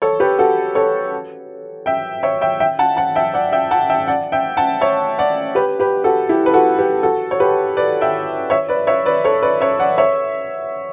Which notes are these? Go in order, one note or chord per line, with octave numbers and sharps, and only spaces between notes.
A4 C#5
G4 B4
F#4 A4
A4 C#5
E5 G5
C#5 E5
E5 G5
E5 G5
F#5 A5
F#5 A5
E5 G5
D5 F#5
E5 G5
F#5 A5
E5 G5
D5 F#5
E5 G5
F#5 A5
C#5 E5
D5 F#5
G4 B4
G4 B4
F#4 A4
E4 G4
B4
F#4 A4
G4 B4
F#4 A4
C#5
G4 B4
B4 D5
E5 G5
C#5 E5
B4 D5
C#5 E5
B4 D5
A4 C#5
B4 D5
C#5 E5
D5 F#5
C#5 E5